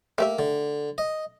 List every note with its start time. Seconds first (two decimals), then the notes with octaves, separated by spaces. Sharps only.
0.18 A3 A#3 G4 E5
0.39 D3
0.98 D#5